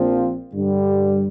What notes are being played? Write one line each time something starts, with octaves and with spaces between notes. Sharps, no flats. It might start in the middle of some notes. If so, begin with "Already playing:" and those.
Already playing: A#1 A#2 F3 C4 F4
G2 D3 G3